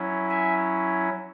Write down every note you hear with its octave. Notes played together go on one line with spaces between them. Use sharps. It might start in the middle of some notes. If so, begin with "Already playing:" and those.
Already playing: F#3 C#4 E4
E5 G#5